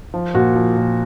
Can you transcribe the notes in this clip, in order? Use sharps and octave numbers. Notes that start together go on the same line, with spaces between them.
F3
A#2 F#4
F3
A#2